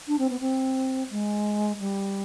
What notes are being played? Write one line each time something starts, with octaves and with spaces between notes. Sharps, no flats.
D4
C4
B3
C4
G#3
G3